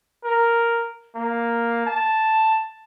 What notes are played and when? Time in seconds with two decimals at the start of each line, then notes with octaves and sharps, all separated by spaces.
0.25 A#4
1.15 A#3
1.86 A5